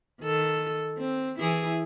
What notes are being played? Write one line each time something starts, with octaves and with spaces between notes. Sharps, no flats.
D#3 A4
C4
E3 E4 G#4